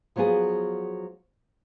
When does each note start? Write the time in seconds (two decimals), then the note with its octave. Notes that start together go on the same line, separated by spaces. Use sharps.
0.16 F3 F#3 B3 F4 G#4